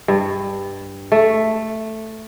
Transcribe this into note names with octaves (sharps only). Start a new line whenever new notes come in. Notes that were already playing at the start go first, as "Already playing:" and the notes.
G2
A3